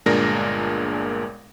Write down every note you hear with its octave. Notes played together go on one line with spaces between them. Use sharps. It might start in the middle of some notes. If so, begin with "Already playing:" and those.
G1 A#2 G#3 D4 A#4 A#6